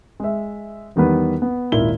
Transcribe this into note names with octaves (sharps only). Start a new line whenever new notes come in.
G#3 E5
E2 D#3 G3 B3 B4
B3
G#1 D#2 A#2 E4 G7